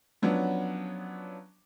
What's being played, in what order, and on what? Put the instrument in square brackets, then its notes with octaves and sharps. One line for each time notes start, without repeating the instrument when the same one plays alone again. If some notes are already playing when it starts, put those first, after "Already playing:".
[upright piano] F3 F#3 B3 C#4 D4